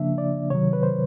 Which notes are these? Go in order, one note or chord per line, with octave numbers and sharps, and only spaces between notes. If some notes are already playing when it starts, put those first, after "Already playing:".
Already playing: C#3 F3 A#3 D4 E5
D5
C3 D#3 F#3 C#5
B4
C5